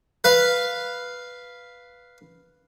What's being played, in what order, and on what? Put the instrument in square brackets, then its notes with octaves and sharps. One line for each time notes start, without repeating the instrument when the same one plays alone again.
[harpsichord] B4 F5